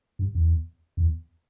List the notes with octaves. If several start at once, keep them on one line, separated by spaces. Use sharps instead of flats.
G2
E2
E2